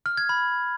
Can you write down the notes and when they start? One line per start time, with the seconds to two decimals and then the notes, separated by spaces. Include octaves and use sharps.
0.06 F6
0.17 G#6
0.29 B5